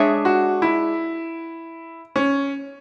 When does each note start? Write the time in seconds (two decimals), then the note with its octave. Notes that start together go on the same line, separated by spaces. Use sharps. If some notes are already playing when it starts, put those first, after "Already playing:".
Already playing: G#3 D4 G#4 C#5 E5
0.25 F#4
0.62 E4
2.16 C#4